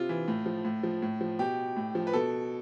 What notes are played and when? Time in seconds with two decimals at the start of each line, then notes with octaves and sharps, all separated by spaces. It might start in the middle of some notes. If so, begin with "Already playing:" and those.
Already playing: C3 F4
0.09 E3
0.28 A2
0.46 F3
0.65 A2
0.83 F3
1.02 A2
1.21 F3
1.39 B2 G4
1.76 A2
1.95 F3
2.07 B4
2.13 B2 A4